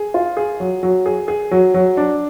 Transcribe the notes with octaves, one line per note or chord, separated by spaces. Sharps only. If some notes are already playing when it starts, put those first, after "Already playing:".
Already playing: G#4
F4
G#4
F#3
F#3
G#4
G#4
F#3
F#3
D4